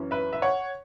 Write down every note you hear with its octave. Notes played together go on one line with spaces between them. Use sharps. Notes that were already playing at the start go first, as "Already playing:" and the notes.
Already playing: F#2 E3 C#4 E4
B4 E5
E5
C#5 F#5